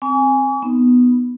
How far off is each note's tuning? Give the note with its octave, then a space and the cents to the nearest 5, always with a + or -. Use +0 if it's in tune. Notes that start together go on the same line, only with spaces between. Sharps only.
C4 +0 G#5 -5 C#6 +45
B3 +0 D#4 +0